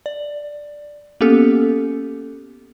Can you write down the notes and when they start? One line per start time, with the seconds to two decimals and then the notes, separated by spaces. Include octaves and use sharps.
0.06 D5
1.21 A#3 B3 C#4 G4 A4